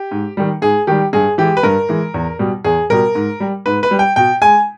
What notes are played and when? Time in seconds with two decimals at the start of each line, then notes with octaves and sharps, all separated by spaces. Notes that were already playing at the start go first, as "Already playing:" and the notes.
Already playing: G4
0.11 G#2
0.37 D#3 G3
0.62 G#2 G#4
0.87 D#3 G3 G4
1.13 G2 G#4
1.38 E3 G#3 G4
1.57 B4
1.63 G2 A#4
1.89 E3 G#3
2.14 E2
2.39 B2 G3
2.64 E2 G#4
2.90 B2 G3 A#4
3.15 G#2
3.40 G3
3.66 G#2 B4
3.83 B4
3.91 G3
3.99 G5
4.16 B2 G5
4.42 G#3 G#5